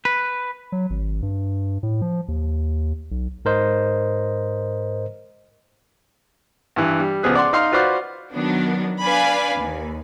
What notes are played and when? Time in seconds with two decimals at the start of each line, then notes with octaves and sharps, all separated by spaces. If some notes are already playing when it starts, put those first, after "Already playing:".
0.05 B4
0.72 F#3
0.90 G#1
1.22 G2
1.83 A2
2.02 F3
2.28 D#2
3.11 B1
3.45 G#2 A#4 C5 D#5
6.76 G2 E3
7.00 G3
7.23 C#2 F3 B3 G#4 F#6
7.35 D5 F#5 C6
7.53 D#4 F5 C6
7.72 F4 F#4 B4 C5 D5 F5
8.33 D#3 F#3 B3 D4
9.02 D4 B4 D5 F5 G#5 B5
9.57 D#2